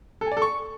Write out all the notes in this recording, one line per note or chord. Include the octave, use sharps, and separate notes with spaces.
A4
G#5
D5
A4
C#6